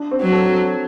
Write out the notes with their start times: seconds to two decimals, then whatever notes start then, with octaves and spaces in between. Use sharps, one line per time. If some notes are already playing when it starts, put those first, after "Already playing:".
Already playing: D4
0.11 C4
0.21 F#3
0.32 A4